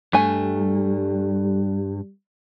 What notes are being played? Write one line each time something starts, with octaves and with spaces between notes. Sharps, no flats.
G2 G3 A3 G#5